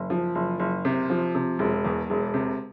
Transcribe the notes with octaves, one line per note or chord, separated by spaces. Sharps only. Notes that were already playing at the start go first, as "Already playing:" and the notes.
Already playing: F#1
F3
F#1
F#1
C3
F3
C3
E1
E2
E1
C3